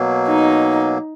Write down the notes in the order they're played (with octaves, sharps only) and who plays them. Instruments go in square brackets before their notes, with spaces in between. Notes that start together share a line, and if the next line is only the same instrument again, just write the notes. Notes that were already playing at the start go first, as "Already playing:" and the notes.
Already playing: [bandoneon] B2 F#3 A#3
[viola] D#4